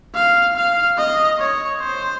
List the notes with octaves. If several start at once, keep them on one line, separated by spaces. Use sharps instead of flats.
F5
F5
D#5
C#5
C5